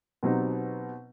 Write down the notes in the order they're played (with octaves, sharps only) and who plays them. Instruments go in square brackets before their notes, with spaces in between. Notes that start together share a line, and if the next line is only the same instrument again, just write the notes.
[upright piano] B2 F#3 C4 D#4 G4